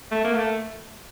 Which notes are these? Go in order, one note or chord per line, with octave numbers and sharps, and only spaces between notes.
A3
A#3
A3